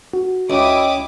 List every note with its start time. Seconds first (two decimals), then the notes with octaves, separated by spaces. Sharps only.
0.13 F#4
0.50 C#2 E4 D#5 G5 D6 D#6